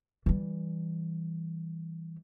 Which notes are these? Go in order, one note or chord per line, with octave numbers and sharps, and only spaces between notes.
E3 G3